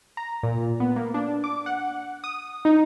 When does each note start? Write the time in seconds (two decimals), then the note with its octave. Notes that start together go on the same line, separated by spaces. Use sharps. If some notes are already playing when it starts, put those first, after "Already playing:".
0.17 A#5
0.43 A#2
0.80 B3
0.96 A#3
1.14 D4
1.44 D6
1.66 F#5
2.24 D#6
2.65 D#4